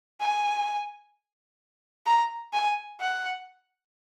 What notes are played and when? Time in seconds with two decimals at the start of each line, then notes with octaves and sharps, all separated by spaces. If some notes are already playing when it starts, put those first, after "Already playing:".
0.20 G#5
2.06 A#5
2.53 G#5
3.00 F#5